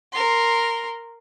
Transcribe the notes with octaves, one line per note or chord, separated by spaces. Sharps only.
A#4 C6